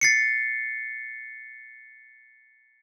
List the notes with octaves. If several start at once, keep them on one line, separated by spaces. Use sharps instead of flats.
A6 C7 C#7